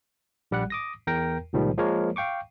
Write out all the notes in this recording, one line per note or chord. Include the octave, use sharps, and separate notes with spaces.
A#1 G3 G4 F#5 F#6
D6 D#6 A#6
E2 A#4 G5 A#6
C#2 A#2 D#3 F3 G3
F3 G#3 A#3 A#4 C#5
F5 G5 C#6 D6